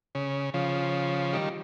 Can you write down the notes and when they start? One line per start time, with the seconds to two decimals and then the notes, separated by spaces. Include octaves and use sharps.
0.15 C#3
0.54 C#3 F3
1.33 D#3 G3